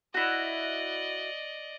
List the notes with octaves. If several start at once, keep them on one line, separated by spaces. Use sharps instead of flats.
E4 F#4 D5 D#5